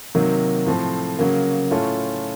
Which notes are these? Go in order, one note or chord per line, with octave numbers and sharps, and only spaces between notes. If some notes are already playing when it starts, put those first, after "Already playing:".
C3 D#3 F#3 A#3
A2 F3 C4
C#3 F#3 A#3
A2 A3 C#4 F4